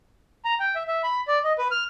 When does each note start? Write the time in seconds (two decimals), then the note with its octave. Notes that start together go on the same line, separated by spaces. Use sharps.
0.45 A#5
0.60 G5
0.75 E5
0.87 E5
1.04 B5
1.28 D5
1.44 D#5
1.58 B4
1.71 F6